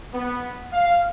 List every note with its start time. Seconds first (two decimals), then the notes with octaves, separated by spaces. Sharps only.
0.13 B3
0.73 F5